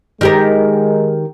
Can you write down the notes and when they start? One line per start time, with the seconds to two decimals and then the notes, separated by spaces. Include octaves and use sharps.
0.21 D#3 G#3 G4 A#4